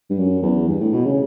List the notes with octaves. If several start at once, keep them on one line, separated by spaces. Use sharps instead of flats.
G2
F#2
E2
G2
A2
B2
C#3